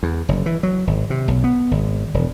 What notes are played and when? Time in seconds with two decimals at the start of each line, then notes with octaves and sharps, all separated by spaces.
0.03 E2
0.29 F#1
0.46 E3
0.63 F#3
0.87 G#1
1.10 C3
1.28 B1
1.44 B3
1.71 G#1
2.14 E1